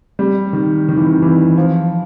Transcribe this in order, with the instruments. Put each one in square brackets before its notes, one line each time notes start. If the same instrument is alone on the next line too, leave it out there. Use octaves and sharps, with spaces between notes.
[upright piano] G3
D#3
D#3
E3
D#3
E3
F3